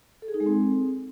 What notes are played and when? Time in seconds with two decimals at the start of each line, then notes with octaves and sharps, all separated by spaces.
0.22 A4
0.28 G#4
0.34 D#4
0.40 G#3
0.46 C4